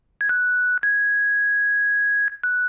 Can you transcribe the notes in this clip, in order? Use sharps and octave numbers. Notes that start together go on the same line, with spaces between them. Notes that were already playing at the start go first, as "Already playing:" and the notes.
G#6
F#6
G#6
F#6